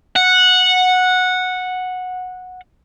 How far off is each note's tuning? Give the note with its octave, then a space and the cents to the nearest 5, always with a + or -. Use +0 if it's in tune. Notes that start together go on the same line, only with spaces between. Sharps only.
F#5 -10